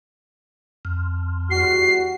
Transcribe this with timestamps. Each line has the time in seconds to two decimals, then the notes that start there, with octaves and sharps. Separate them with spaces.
0.85 F2
1.51 E2 G3 F#4 C7